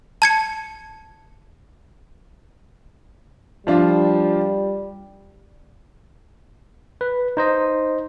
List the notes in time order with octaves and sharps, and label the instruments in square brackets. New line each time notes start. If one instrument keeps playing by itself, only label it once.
[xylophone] A5 G#6 C#7
[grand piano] F3 D4 F4 [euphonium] G3
[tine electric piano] B4
D#4 C5 D#5